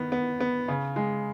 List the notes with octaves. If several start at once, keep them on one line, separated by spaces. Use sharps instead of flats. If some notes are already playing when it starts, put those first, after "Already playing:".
Already playing: D#3 B3
B3
B3
C#3
G#3